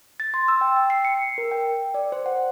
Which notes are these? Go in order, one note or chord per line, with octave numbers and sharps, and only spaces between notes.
A6
C6
E6
G5
G5
C7
C#7
A#4
G5
D5
C5
F#5